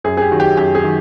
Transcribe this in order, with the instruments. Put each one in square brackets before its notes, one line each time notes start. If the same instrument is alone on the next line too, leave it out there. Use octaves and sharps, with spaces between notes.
[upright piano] F#2 G#4
G#4
G4
D#3 F#3
G4
F#2 G4
G#4
D#3 F#3